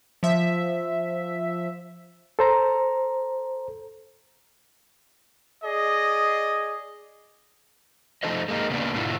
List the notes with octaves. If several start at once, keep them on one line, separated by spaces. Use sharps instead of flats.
F3 E5
A4 C5 A#5
G#4 D5 D#5
F3 A3 D#4 A4 C5 D#5
G#3 A#3 D#4
C#3 A#3 B3 D4
G#2 B2 D3 E4 F4